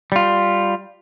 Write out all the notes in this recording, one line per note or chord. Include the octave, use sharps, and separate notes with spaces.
G3 F4